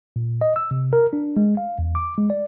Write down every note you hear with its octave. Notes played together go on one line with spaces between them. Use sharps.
A#2
D#5
E6
C3
A#4
D4
G#3
F5
E2
D6
G#3
D5